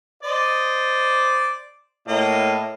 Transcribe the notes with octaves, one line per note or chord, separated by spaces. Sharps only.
C5 D5 D#5
A2 A#3 D#5